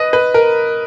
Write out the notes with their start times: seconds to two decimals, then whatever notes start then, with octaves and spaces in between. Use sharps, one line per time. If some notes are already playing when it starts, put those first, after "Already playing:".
Already playing: B4 D#5
0.13 B4
0.34 A#4